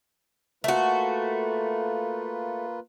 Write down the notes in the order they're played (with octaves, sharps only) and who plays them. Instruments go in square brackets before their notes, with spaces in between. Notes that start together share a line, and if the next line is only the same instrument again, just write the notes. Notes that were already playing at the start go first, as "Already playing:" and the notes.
[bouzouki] A3 F#4 [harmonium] A#3 F4 B4